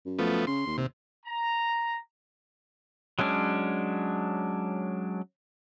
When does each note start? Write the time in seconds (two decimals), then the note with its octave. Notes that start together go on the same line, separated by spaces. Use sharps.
0.05 F#2
0.19 F3 A3 B3
0.47 C#3 C6
0.66 D#2
0.78 C3
1.26 A#5
3.19 F#3 G#3 C#4 D4